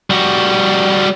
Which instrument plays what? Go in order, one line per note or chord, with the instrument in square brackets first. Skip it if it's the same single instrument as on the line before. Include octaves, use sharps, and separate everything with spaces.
[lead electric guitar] G3 F#4